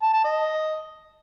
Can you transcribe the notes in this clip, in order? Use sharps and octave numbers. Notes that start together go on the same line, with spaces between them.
A5
A5
D#5